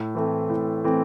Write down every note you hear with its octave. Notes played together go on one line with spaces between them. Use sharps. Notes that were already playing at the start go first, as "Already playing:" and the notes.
Already playing: A2
E3 A3 C4
A2
E3 A3 C4